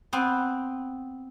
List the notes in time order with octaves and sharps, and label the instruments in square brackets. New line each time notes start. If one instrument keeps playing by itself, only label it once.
[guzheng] B3 C4